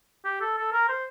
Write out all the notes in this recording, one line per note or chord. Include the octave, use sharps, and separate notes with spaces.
G4
A4
A4
A#4
C5